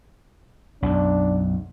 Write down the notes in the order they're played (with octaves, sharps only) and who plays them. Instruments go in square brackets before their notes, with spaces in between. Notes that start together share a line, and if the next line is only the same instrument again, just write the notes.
[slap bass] B1 F#2 [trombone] D4